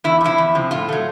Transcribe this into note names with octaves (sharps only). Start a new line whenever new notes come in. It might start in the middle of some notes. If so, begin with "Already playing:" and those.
E2 E4
C3 F3 E4
E2
C3 F3
A2 F4
F#3 A3